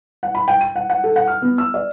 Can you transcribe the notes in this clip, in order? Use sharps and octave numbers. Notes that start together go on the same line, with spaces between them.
F#5
B5
G5
D#7
F#5
F#5
A4
F#5
F6
B3
E6
D5